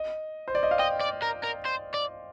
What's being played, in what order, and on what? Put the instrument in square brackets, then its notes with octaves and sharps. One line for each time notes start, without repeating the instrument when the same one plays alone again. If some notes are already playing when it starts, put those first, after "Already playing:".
Already playing: [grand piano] D#5
C5
D5
D#5
F5
[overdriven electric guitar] D#5 [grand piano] G5
[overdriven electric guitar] D5
A#4
A#4
C5
D5